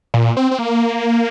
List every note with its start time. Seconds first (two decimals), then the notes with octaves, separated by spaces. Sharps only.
0.14 A#2
0.37 C4
0.51 C4
0.59 A#3